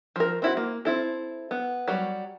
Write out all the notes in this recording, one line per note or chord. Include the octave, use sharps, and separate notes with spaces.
F3 A#4
C4 E4 F#4
A#3
C4 E4 A4
B3
F#3 G3